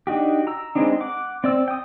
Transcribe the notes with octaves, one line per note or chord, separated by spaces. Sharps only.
D4 D#4 F#4 G4
A#5 E6
G#3 B3 C4 D4 D#4
F#5 D6
C4 D5 E6
G5 D#6